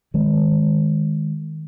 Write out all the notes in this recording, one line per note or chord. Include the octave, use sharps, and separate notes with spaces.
D#3 G#3